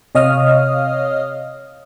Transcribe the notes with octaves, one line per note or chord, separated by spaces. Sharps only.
C3 C#5 D#5 F5 D#6 F6